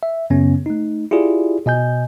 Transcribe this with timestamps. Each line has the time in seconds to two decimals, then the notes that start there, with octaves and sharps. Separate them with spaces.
0.03 E5
0.30 F#2 C#3 B3 C#4
0.66 A3 D#4
1.11 E4 F4 G4 G#4 D5
1.66 B2 D#5 G#5 G6